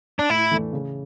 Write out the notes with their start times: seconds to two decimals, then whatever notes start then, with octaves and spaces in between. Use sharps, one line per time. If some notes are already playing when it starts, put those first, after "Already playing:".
0.19 D4
0.29 A2 E4
0.51 E3 A3 D4
0.73 C#3